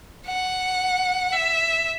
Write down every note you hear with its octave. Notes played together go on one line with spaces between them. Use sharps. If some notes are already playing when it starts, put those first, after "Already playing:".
F#5
E5